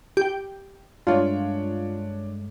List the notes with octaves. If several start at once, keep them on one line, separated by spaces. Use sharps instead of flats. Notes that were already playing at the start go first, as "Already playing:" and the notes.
G4 G5
G2 G#3 A3 D4 F4 C#5